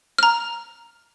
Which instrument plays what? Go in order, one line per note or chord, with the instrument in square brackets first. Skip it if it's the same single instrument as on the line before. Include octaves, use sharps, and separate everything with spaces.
[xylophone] A#5 F6